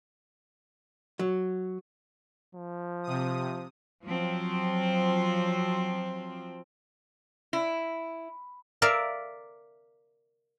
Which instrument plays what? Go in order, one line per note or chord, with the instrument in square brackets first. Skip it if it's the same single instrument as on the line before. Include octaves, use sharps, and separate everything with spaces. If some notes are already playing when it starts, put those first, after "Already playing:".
[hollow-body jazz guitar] F#3
[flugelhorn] F3
[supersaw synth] C3 D#6
[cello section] F3 F#3 C4
[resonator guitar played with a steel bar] E4
[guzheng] A#4 D5 E5 F5